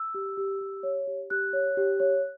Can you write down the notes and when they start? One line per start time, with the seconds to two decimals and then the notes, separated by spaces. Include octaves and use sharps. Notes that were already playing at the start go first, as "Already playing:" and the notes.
Already playing: E6
0.14 G4
0.37 G4
0.61 G4
0.83 C#5
1.07 G4
1.30 G4 F#6
1.53 C#5
1.77 G4
2.00 C#5